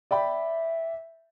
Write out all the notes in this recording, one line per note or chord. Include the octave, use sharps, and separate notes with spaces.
D5 E5 G5 B5